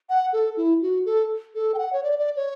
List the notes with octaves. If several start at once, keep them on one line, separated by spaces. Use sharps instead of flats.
F#5
A4
E4
F#4
A4
A4
G5
F#5
C#5
D5
D5
C#5